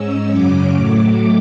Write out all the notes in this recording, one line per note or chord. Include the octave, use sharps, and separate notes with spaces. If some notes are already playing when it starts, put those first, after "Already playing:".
Already playing: G#2 G#3 C#4 E6
F#2 C#3 F#3 C#4 D6
A2 F#3 A3